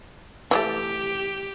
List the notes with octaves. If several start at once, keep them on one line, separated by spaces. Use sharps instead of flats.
E3 F#3 A3 G4